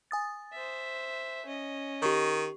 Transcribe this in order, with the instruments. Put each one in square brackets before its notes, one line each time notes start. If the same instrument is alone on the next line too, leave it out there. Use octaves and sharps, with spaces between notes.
[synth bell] G#5 D#6 A6
[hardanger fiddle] C5 E5
C#4 D#5
[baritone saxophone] D#3 [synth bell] G4 C#6